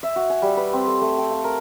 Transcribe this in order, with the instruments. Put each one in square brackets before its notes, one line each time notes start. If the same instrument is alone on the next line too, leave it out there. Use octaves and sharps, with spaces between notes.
[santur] E5
F#4
G#5
G3
B4
C4
A4
A3
G5
F5
A#4